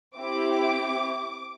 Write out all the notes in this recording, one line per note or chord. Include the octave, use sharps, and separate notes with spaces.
C4 E4 G4 D6